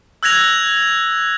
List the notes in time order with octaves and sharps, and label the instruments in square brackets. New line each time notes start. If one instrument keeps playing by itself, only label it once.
[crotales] E6 F#6 G#6 A#6 F7